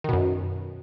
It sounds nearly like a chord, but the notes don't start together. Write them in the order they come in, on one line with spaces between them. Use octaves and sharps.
D#3 B2 F#2